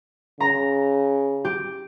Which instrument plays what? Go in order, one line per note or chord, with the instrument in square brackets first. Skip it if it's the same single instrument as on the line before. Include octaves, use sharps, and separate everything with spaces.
[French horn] C#3 [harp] A#5
[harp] G4